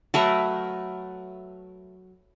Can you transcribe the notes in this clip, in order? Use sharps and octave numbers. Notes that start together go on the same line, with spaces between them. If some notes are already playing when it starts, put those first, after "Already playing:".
F#3 A3 A#4 B4